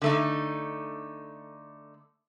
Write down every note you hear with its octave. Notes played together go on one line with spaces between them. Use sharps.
D3 A3 D#4